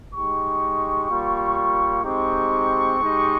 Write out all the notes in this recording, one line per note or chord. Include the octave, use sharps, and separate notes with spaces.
G#3 D#4 G4 C#6
G3 A#3 F4
G#3 C4 D#4 G4 C#6
G#3 D#4 G4